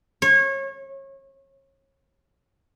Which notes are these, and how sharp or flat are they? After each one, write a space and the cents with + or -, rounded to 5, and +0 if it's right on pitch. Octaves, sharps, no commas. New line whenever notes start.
C#5 -30